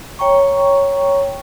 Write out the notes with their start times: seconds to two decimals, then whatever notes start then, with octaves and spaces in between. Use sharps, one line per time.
0.19 C#5 G5 A#5 C#6